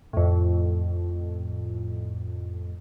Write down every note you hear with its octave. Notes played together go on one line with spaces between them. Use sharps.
F2 A2